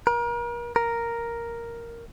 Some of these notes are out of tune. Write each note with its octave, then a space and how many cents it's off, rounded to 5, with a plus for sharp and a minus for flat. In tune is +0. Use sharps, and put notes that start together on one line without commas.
A#4 +35
A#4 +0